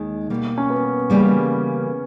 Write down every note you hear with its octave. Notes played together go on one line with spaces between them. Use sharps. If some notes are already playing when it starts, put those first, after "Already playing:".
Already playing: D#2 D#3 G#3
B2 G3 A#3
C#4
B3
C#3 E3 G3 A#3